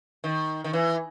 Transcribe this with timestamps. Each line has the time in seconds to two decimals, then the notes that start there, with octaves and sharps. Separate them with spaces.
0.24 D#3
0.64 D#3
0.73 E3